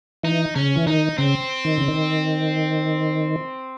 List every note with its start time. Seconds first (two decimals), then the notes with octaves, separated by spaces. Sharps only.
0.23 E3 D#4
0.55 C#3 C#4
0.76 E3
0.87 D#3 D#4
1.18 C#3 C4
1.65 D#3
1.78 C#3
1.88 D#3